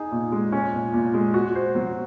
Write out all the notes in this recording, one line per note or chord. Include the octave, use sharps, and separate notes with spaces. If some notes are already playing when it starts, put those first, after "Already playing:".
Already playing: D#4 G#4
A#2
G#3
C#4
A#2
A#2
G#3
F#4
C5
F#3